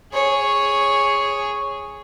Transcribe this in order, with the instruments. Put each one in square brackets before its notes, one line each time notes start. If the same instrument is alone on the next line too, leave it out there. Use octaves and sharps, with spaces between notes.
[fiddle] G#4 C#5